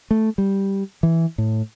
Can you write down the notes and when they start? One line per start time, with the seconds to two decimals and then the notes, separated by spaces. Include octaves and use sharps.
0.11 A3
0.38 G3
1.03 E3
1.38 A2